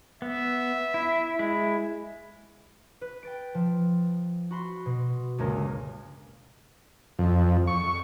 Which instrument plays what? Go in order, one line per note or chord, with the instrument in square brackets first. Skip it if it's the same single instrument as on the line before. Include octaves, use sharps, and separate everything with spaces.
[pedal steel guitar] B3 [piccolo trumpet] E5
[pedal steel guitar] E4
G#3 E4
[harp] B4
G5 A6 D7
F3
F#4 B5 C6
B2
G1 C#2 G#3 A#3 A#4
[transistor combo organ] F2
C#6